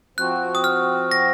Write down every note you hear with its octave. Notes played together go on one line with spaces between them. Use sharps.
F3 C4 F#4 F#6
D#6
F6
A#6